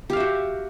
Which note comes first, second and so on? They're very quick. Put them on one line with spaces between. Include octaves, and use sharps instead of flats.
G4 F5 E5 F#4